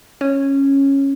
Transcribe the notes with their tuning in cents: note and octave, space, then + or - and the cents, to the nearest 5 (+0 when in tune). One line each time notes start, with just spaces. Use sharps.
C#4 -10